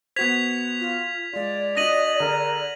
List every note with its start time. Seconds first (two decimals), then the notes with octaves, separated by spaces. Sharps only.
0.16 B3 F#4 C5 G#6 B6 F7
0.80 F4
1.33 G#3 F4 D5
1.77 D4 F#4 D#5 A#6 D#7 F#7
2.20 D3 G#4 A#4